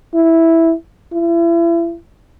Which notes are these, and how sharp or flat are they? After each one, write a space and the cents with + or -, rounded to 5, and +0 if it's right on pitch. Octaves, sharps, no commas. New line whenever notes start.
E4 -5
E4 +35